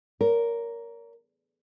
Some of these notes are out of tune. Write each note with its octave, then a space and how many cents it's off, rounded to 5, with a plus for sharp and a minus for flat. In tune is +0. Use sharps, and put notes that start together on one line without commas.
A#4 +0 C#5 +40